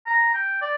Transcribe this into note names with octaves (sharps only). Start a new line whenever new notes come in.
A#5
G5
D5